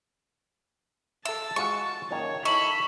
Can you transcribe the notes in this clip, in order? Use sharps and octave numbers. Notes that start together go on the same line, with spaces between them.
A4 E5 A5 E6
G#3 F4 F#4 C#6
F#2 A#2 D#3 C#5
D#4 E4 A4 B5 C#6 F#7